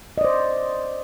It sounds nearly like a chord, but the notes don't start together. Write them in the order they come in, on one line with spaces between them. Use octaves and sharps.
D#5 D5 C5